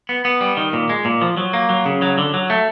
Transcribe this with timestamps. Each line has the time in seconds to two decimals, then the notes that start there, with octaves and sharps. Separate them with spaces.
0.09 B3
0.25 B3
0.41 G3
0.57 D#3
0.73 A#2
0.89 G#3
1.05 A#2
1.22 F3
1.37 F#3
1.53 A#3
1.70 F#3
1.86 C#3
2.02 F#3
2.18 D3
2.34 F#3
2.50 A3